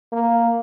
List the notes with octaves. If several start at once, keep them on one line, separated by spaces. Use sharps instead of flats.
A#3